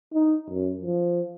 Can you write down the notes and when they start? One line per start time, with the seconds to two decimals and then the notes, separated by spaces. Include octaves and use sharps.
0.14 D#4
0.50 F#2
0.81 F3